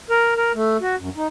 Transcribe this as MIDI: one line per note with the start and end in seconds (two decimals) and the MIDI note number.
0.10 0.34 70
0.37 0.52 70
0.55 0.77 57
0.81 0.96 66
0.98 1.09 42
1.16 1.27 63